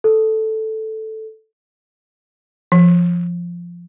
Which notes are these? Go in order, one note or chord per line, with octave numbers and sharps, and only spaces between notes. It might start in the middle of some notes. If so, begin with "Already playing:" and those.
A4
F3